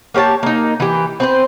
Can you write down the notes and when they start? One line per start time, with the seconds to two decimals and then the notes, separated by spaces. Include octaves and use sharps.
0.14 A#3 G4 C#5 A5
0.43 A#3 D#4
0.80 E3 G4
1.20 C4 B4 C5